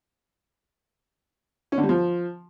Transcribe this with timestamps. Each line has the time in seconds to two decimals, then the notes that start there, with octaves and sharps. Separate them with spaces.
1.72 C#4
1.78 D3
1.83 G3
1.89 F3